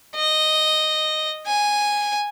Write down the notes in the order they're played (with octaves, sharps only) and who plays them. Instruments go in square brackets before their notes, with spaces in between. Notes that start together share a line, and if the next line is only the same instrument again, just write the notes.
[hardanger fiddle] D#5
G#5